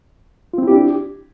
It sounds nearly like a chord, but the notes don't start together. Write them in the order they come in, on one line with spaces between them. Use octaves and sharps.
F4 C4 E4 G4 D4